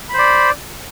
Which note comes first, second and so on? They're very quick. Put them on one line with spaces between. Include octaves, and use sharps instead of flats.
B5 C5 D5